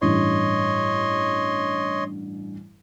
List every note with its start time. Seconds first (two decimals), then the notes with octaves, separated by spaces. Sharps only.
0.02 A1 G2 C#5 D#5 C6